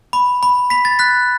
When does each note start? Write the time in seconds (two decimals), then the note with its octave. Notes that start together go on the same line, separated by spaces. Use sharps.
0.13 B5
0.43 B5
0.70 B5 B6
0.85 A6
0.99 F#6 B6